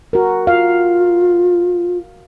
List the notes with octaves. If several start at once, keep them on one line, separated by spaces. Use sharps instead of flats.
F#4 A#4
F4 F5